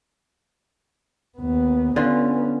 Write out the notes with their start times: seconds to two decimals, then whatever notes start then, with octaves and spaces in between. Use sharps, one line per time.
1.38 D#2 B3
1.96 D3 B3 C#4 F4